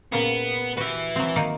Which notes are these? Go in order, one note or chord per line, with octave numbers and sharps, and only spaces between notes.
A#2 C#3 A#3 B3
F#4 G4 B4 E5
F#3 C4
D#3 A#3 D#4